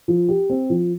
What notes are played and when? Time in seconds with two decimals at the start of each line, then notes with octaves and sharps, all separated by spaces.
0.08 F3
0.29 G4
0.50 C4
0.70 F3